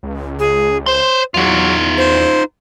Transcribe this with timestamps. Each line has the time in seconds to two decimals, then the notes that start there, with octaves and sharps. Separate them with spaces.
0.03 C#2
0.39 G#4
0.86 C5 C#5 C6
1.34 E2 F#3 D#4 F4
1.98 C5